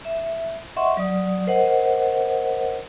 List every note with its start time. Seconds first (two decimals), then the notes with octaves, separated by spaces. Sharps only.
0.05 E5
0.76 D#5 E5 F#5 C6 C#6
0.97 F#3 D5 D#6
1.47 A#4 C5 D#5 F#5